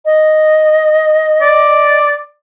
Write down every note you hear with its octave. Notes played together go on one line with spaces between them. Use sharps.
D#5
D5